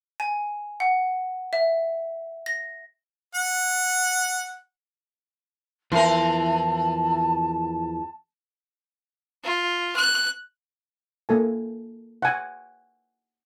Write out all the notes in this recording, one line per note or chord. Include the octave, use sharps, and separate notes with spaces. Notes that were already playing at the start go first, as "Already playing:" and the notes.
G#5
F#5
E5
A#6
F#5
E2 E3 F3 A#4 C5 A5
F4
F#6
A#3 A4 G#5
F#5 G#5